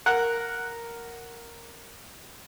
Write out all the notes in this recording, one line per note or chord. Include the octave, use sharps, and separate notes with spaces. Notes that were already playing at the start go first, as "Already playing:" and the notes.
A#4 F#5